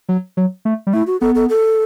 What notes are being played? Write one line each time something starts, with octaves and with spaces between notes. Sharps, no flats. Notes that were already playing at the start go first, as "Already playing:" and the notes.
F#3
F#3
A3
G3
A3 E4
F#4
B3 A4
A4
A4